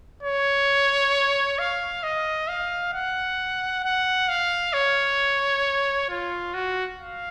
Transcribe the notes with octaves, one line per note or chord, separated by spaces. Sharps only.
C#5
F5
D#5
F5
F#5
F#5
F5
C#5
F4
F#4
F5